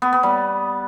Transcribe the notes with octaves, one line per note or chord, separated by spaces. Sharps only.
B3
B3
G3